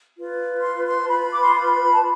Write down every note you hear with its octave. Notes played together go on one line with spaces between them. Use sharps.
F4 B4
C6
C6
A5
F4 B4 B5
D6
C6
B5
A5